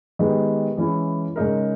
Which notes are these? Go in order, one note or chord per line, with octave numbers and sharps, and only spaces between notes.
D#3 G#3 B3 G4 B4
E3 G#3 C#4 E4
C#3 G#3 D#4 A#4